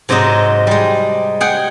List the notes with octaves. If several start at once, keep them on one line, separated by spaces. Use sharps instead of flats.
G#2 C3 F#3 D#4 D#5
G3 G#3
G#4 F#5 G5